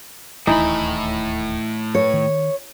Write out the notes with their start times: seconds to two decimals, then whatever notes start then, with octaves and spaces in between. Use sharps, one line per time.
0.47 D1 D#2 A2 E3 A3 D#4 B5
1.95 C#5
2.14 D#3